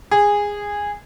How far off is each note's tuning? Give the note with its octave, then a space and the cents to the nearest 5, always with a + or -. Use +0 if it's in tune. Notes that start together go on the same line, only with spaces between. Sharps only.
G#4 -15